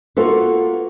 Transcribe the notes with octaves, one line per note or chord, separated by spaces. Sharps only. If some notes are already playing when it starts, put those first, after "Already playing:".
A#3 F4 F#4 A4 B4